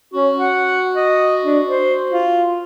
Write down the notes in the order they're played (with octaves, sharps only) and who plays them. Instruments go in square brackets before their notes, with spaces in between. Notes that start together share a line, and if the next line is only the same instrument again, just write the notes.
[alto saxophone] C#4 [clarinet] F#4
[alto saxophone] F#5
D#5
D4
C5
F4